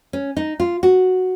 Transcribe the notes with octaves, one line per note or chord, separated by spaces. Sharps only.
C#4
D#4
F4
F#4